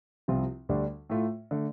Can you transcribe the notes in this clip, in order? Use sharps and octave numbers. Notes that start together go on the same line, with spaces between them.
C2 C3 F3 C4 F4
D2 D3 G3 D4
A2 A3 F4
D3 A3